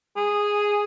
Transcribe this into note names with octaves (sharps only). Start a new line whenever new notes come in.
G#4